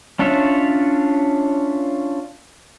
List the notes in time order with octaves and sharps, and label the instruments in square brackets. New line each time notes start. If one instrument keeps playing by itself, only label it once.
[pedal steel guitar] C#4 D4 F4 C#5 E5